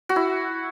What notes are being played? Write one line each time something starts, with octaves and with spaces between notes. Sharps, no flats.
F#4
E4